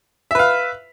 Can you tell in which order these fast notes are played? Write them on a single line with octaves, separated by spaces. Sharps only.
E5 B4 F5